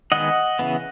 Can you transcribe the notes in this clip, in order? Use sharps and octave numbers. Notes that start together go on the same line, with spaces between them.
D#3 G#3 B3 D#5 F#5
C#3 E3 B3